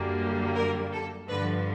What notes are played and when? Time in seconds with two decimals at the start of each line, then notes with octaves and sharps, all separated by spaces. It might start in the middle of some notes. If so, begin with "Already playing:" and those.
Already playing: F#2 D3 G3 A#3
0.56 A#4
0.92 A4
1.29 G2 D3 F3 B4